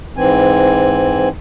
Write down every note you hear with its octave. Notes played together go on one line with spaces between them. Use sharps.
G#2 E3 C4 G#5